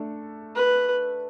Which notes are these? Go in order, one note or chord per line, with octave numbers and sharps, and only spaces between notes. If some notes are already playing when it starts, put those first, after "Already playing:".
Already playing: A3 D4 A4
B4